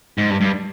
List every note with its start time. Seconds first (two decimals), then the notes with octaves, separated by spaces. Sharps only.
0.18 G#2
0.30 G2
0.41 G2